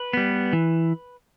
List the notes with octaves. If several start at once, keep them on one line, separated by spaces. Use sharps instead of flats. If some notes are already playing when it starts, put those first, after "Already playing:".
Already playing: B4
G3 B3
E3